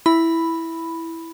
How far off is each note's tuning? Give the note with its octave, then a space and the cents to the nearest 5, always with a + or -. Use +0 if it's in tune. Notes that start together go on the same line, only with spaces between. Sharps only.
E4 +0 B5 +0